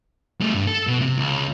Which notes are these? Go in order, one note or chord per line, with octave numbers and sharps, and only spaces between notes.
G3 A3
G2
A4
B2
C3
C#2